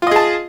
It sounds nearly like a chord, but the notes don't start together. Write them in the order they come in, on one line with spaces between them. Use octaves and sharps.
F4 D#5 G#4 A5